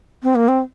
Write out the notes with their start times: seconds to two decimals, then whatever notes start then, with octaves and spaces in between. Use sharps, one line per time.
0.23 C4
0.35 A#3
0.48 C4